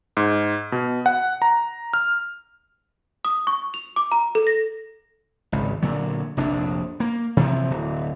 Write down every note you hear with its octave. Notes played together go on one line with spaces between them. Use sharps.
G#2
B2
F#5
A#5
F6
D#6
C#6
F7
D6
A#5
A4
A#6
G#1 C#2
A#2 D3 F#3
F1 A#1 D4
A#3
C3 E3 F3
D1